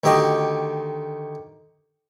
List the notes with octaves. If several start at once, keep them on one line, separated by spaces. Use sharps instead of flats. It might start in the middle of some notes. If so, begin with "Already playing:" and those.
D2 D#3 G4 D#5 C#6